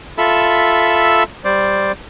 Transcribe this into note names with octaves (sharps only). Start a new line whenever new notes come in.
F4 A4 E5 B5 E6
G3 C5 D5